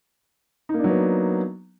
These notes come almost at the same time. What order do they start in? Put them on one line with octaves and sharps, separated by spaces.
D#4 A#3 D4 F#3 B3